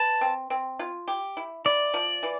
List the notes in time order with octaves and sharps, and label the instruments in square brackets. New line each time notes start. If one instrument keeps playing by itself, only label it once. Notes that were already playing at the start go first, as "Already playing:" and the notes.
Already playing: [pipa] B4 [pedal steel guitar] A5
[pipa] C4
C4
F4
G4
E4
[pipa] E4 [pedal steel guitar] D5
[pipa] F3
E3